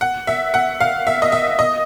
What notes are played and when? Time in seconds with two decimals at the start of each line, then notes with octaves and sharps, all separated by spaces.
0.01 F#5
0.27 E5
0.54 F#5
0.80 F5
1.07 E5
1.22 D#5
1.32 E5
1.59 D#5